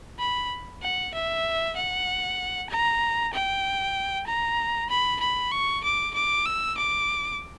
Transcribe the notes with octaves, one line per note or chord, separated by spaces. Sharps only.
B5
F#5
E5
F#5
A#5
G5
A#5
B5
B5
C#6
D6
D6
E6
D6